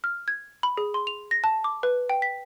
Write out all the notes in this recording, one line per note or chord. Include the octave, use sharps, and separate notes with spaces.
F6
G#6
B5
G#4
C6
F7
A#6
A5
D6
B4
G5
B6